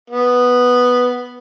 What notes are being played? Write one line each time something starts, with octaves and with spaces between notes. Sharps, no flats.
B3